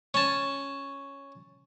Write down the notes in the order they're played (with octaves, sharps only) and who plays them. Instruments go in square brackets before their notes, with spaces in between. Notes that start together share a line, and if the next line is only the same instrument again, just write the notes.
[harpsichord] C#4 A5